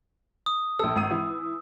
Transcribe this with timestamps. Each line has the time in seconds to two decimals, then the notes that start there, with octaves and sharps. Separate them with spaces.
0.46 D#6
0.79 A#1 A4 E6
0.96 G#1 D#6 D#7
1.11 E3 E4